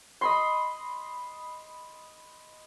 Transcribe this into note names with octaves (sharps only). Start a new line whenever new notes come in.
D#5 B5 C6